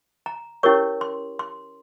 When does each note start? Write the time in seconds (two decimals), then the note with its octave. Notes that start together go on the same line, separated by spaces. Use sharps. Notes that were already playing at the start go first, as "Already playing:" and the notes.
0.26 A#5
0.63 C#4 E4 G4 A#4 C#5 C#6
1.01 C6
1.39 C6